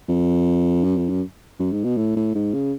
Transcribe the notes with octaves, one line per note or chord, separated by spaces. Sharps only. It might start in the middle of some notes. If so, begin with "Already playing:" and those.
F2
F#2
F2
F#2
F#2
G#2
B2
A2
A2
G#2
C#3